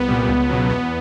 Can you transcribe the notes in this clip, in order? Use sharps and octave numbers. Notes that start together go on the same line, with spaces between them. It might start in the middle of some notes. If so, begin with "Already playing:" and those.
Already playing: C2 B3
A#2 G3
C#2
B2 F#3
E2 B3